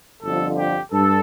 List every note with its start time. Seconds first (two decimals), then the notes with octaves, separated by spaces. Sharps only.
0.23 G1 F2 D3 F3 A4
0.58 G4
0.92 G2 A4